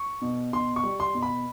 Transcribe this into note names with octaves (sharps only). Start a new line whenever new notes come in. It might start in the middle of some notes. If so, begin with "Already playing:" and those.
Already playing: C#6
B2
B2 C6
C#6
G3
C6
B2
B5